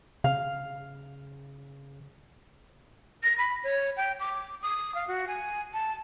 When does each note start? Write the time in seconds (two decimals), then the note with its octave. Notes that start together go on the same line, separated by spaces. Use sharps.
0.24 C#3 F5
3.23 A#6
3.38 B5
3.64 C#5
3.97 G5
4.20 D6
4.62 D#6
4.95 F5
5.08 F#4
5.28 G#5
5.73 A5